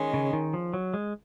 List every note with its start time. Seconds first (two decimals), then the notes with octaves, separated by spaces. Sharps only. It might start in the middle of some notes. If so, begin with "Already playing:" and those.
Already playing: D#3 G#3 C#4
0.14 C#3
0.33 D#3
0.54 F3
0.74 F#3
0.94 G#3